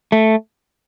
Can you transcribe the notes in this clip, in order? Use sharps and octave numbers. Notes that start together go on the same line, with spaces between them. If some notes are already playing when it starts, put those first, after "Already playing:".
A3